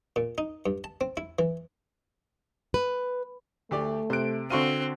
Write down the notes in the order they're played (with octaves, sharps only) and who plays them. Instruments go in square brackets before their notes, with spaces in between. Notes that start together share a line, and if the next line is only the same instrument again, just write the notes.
[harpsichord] A#2
D#4
G2
A5
C4
E4
E3
[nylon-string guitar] B4
[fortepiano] D2 G4 D5 [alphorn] A3
[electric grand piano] C3 D7 [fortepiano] C5 F#6
[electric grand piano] D3 F#4 D#7 [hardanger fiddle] C4 [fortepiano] F5 C6 C#6